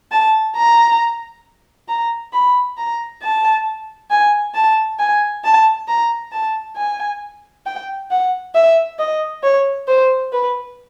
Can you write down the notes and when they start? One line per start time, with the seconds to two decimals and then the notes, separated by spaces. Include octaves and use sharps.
0.11 A5
0.56 A#5
1.88 A#5
2.33 B5
2.78 A#5
3.23 A5
4.11 G#5
4.55 A5
4.99 G#5
5.45 A5
5.88 A#5
6.32 A5
6.77 G#5
7.66 G5
8.11 F#5
8.55 E5
8.99 D#5
9.43 C#5
9.88 C5
10.32 B4